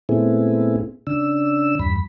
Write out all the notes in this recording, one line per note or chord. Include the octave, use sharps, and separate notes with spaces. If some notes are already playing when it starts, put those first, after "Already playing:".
A#2 A3 B3 C4 E4 G#4
C#3 D4 E6
E2 G2 B5